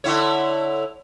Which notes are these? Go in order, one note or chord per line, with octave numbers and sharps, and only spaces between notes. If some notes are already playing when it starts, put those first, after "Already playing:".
D3 E4 C#5